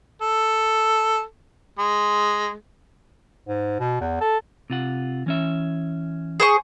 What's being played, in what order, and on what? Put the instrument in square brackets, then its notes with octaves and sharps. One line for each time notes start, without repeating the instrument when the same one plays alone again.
[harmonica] A4
G#3
[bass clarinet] G#2
B2
E2
A4
[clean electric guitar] C3 F4 F#5
E3 C#4 E5
[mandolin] G#4 C5 C#6